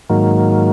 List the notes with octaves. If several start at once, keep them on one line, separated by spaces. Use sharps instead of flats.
G#2 D#3 F#3 A#3